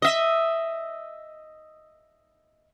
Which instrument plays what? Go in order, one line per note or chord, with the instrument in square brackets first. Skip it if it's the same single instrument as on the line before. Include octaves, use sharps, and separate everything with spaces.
[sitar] D#5 E5